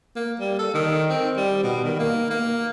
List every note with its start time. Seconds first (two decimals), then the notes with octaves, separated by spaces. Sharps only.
0.16 A#3
0.40 G3
0.59 A4
0.74 D#3
1.10 C4
1.37 G3
1.63 B2
1.84 D#3
1.99 A#3
2.31 A#3